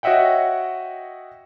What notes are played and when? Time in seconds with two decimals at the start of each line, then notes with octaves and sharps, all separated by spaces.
0.03 F#4 C#5 D#5 E5 F#5 G5